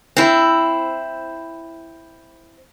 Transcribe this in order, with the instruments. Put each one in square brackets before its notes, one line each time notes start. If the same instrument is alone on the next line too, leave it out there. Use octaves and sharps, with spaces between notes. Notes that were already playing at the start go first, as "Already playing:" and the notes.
[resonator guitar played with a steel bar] C4 E4